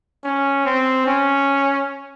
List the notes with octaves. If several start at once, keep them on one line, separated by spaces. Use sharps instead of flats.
C#4
C4
C#4